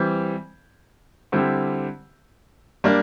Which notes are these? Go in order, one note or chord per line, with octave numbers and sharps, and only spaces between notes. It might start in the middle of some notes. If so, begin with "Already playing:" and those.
Already playing: E3 G3 C4
D3 G3 C4 E4 G4
G3 A#3 D4